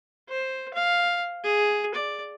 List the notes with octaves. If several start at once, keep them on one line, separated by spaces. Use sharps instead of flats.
C5
F5
G#4
D5